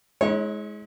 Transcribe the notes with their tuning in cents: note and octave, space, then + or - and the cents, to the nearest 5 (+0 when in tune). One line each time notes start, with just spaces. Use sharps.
G#3 +20 E4 -45 C#5 -20